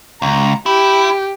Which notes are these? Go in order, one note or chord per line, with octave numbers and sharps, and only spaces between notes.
C#2 A#5
E4 G4